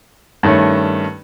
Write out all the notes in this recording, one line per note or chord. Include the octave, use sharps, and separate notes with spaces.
G2 D#3 A3 C#4